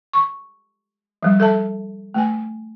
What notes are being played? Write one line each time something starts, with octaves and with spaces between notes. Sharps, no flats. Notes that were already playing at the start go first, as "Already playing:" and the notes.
C#6
F3 G3
A4 E5 A5
A3 G#5